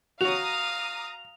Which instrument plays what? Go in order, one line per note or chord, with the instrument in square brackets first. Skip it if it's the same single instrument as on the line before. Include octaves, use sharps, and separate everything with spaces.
[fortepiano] F#4 C#5 [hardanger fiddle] F5 [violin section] A#5 D#6 [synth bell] F7